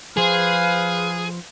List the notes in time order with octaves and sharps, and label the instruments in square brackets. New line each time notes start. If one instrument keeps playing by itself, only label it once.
[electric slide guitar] F3 C5 [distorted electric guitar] G#4 [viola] B4 F5